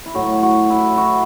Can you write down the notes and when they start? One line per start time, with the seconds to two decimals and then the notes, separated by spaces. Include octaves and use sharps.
0.06 E4
0.15 A2 F#3 F#4
0.43 F#4
0.70 E4
0.97 F#4